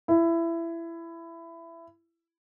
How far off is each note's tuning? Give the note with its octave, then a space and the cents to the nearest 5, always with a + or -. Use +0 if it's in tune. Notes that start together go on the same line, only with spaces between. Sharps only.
E4 +20